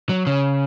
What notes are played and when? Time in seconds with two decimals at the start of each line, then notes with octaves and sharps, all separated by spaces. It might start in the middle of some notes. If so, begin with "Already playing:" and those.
0.09 F#3
0.27 C#3